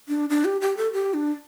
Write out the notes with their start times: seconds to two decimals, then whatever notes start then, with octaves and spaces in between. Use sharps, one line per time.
0.08 D4
0.30 D4
0.45 G4
0.61 G4
0.77 A4
0.93 G4
1.14 D4